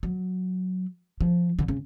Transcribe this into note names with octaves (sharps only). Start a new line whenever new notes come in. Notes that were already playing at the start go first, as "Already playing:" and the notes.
F#3
F3
D3
C#3